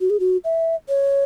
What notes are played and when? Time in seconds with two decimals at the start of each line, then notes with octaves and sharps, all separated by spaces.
0.01 F#4
0.10 G#4
0.20 F#4
0.44 E5
0.89 C#5